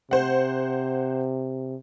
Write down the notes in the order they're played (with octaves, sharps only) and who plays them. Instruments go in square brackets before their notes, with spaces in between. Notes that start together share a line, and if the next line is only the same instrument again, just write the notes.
[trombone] C3 [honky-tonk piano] C5 F#5